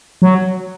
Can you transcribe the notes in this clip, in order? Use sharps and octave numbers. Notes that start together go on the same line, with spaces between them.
F#3